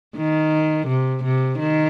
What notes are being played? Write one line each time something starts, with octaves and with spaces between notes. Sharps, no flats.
D#3
C3
C3
D#3